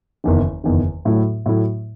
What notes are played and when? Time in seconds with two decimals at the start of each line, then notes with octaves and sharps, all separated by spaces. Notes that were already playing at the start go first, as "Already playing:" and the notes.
0.24 F#1 E2 D#3
0.64 F#1 E2 D#3
1.05 A2 F#3 A3 E4
1.46 A2 F#3 A3 E4